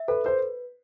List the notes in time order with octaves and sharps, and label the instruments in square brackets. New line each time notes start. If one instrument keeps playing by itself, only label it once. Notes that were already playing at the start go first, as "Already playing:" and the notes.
Already playing: [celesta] E5
[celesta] A4 [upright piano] B4
[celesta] B4 [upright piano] C5